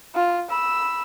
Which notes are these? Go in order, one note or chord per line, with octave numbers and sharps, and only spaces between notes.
F4
B5 E6